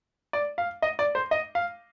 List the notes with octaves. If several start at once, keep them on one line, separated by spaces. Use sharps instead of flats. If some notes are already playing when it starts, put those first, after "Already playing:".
D5
F5
D#5
D5
C5
D#5
F5